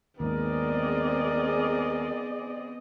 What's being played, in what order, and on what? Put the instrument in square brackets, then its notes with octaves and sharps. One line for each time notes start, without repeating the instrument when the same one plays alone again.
[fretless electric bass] D#2 G#2 [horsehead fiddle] B3 D#5 [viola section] C4 G#4 D5 [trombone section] A#4